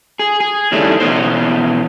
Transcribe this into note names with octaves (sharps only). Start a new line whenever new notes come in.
G#4
G#4
D#3 G3 A3 C#4 D4 E4
B2 E3 B3 C#4 C5